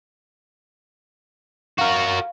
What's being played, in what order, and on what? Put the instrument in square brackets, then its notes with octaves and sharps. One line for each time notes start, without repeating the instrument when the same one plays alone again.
[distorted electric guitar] F#4 A#4 [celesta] F5